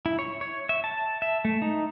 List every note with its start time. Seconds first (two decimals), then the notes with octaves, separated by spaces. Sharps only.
0.06 E4
0.19 C#5
0.41 C#5
0.69 E5
0.84 A5
1.22 E5
1.45 A3
1.62 D#4